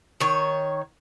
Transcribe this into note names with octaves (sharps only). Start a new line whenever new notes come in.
D#3 C#5